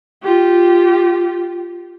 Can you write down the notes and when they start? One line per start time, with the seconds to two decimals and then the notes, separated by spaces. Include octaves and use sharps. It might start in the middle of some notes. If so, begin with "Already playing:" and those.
0.23 F4 G4